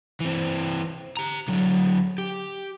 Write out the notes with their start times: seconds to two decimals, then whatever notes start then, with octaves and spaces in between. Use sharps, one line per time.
0.20 E3 C4
1.17 G4 A#5
1.48 D3 F#3
2.18 G4